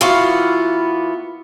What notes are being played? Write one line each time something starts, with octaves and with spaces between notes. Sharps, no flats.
E3 A#3 B3 F4 F#4